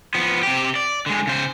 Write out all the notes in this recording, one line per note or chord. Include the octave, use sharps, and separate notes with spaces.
F3 B3
C3 G4
D5
D3 G#3
C#3 C5